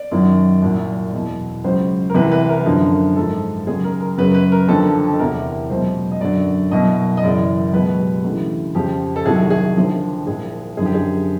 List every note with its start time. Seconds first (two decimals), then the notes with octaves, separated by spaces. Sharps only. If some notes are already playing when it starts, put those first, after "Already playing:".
Already playing: D5
0.11 F#2 D#3 F#3
0.62 C2 A#2 F#3
1.13 E2 B2 F#3
1.64 C#2 C#3 F#3 C5
2.10 A#4
2.14 C2 C3 E3 B4
2.32 B4
2.49 A#4
2.66 F#2 D3 F3
3.16 G#2 F3 A4
3.67 D#2 C#3 F#3 G#4
3.84 A#4
4.01 A#4
4.18 F#2 C#3 F#3 B4
4.34 B4
4.52 A#4
4.68 D#2 D3 F3 A4
5.14 A4
5.19 E2 C3 E3 A#4
5.70 C#2 B2 F#3 C5
6.11 D#5
6.21 F#2 D3 F#3 D5
6.71 C2 B2 F#3 D#5
7.17 D#5
7.23 F#2 C#3 E3 D5
7.73 C#2 B2 F#3 B4
7.98 G4
8.24 D2 C#3 E3
8.75 F2 C#3 F3 G4
9.16 A4
9.25 C2 C3 D#3 F#3 G#4
9.50 G#4
9.77 D#2 D3 F3
10.27 C2 A#2 F3 G#4
10.77 F#2 D3 F3 G#4
10.86 G4
10.94 G#4